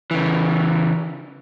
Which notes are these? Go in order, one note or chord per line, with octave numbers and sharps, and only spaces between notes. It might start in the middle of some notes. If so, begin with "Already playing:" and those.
C#3 E3